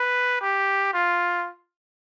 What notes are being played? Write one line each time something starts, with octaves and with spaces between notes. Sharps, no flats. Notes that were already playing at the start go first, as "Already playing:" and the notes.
Already playing: B4
G4
F4